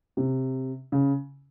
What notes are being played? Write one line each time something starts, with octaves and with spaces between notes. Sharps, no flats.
C3
C#3